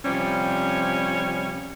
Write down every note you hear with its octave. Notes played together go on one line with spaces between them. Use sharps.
C3 F3 G3 C#4